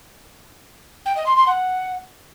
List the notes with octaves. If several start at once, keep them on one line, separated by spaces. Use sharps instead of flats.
G5
D#5
C6
C6
F#5